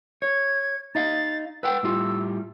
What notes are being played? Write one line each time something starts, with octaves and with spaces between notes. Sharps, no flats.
C#5 G#6
D#4 D#5 F5 A6
B4 F#5 G5 E6
A2 G3 F4